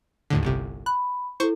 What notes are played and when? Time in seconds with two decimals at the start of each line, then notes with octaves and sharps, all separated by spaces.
0.30 D#2 A2 D3
0.43 G1 C2 C3
0.86 B5 F#6
1.40 E4 A4 C5 C#6